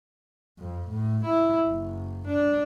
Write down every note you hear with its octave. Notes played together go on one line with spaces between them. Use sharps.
F2
A2
E4
F#1
D4